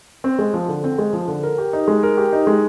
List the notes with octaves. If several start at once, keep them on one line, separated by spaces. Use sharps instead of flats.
C4
G#3
F3
D3
C4
G#3
F3
D3
A#4
G4
D#4
G#3
A#4
G4
D#4
G#3